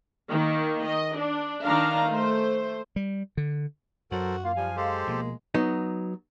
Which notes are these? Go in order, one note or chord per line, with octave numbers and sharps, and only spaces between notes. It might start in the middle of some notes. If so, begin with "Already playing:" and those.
D#3 A#3
D#5
D4
D#3 D4 F5 A#5
A3 C5
G3
D3
F#2 F#3 F#4 A4 A#4 C5
A#3 F4 F5
F3 G3 G#5
G#3 G4 A4 C5
B2 F3 A#3
F#3 B3 D#4